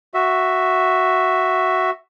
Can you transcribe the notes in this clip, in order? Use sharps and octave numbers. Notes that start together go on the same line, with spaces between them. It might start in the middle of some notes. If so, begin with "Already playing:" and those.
F#4 E5